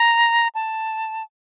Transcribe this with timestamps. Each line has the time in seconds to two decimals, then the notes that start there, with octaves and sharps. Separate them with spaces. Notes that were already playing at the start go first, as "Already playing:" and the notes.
Already playing: A#5
0.55 A5